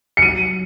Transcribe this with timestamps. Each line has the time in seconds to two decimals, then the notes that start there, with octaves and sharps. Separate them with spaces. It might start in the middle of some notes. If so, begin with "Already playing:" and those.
0.17 C#7
0.22 F#3 D#7